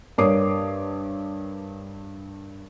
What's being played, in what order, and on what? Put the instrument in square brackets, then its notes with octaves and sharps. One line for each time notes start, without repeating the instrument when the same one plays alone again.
[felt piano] G2 A#4 C#5 D6 D#6 C7